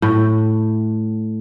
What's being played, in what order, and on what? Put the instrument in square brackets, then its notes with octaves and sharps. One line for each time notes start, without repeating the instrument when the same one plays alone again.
[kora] A2